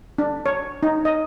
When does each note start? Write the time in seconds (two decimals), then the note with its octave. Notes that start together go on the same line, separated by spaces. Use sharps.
0.18 D4
0.46 C#5
0.83 D#4
1.05 D#5